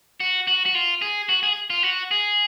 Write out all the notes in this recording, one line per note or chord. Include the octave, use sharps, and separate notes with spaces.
F#4
F#4
F#4
F4
G#4
F#4
G#4
F4
F#4
G#4